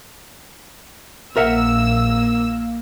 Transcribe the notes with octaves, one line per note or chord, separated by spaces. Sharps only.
A#1 A#3 A#4 E5 F#5 E6